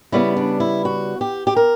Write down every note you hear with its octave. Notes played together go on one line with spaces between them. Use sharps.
C#3 G3 B3 E4
D4
E4
F#4
G4
G4
A#4